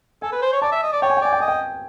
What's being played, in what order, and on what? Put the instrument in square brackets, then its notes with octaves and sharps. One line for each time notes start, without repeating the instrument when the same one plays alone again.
[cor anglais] A4 [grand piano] G#5
[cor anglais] B4
C5
C#5
[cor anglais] D5 [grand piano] A5
[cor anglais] E5
D#5
D5
[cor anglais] C#5 [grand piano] G5
[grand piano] G#5
G5
[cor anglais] D5 [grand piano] G#5
[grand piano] G5
[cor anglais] D#5 [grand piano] G#5
[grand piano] G5